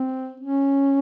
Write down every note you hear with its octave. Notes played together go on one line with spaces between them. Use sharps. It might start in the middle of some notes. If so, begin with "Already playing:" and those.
Already playing: C4
C#4